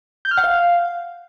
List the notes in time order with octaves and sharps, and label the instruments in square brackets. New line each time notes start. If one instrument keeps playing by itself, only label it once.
[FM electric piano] G6
F6
F#5
F5